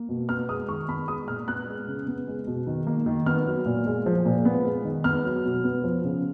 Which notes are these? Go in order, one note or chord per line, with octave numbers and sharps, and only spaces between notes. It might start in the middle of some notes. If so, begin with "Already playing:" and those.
Already playing: A#3
B2
B3 F6
G#3 D#6
D#3 C#6
B3 B5
G#3 D#6
A#2 F6
B3 F#6
G#3
C#3
B3
G#3
B2
D#3
A#3
D#3
B3 F6
F#3
A#2
G#3
F3
A#2
B3
G#3
D#3
B3 F6
F#3
B2
B3
F3
C#3